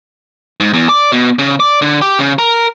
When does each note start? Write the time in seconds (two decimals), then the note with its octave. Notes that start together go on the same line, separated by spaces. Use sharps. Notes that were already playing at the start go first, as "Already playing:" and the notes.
0.60 G#2
0.74 E2
0.89 D5
1.12 B2
1.39 C#3
1.60 D5
1.82 D3
2.01 G4
2.19 C#3
2.39 A#4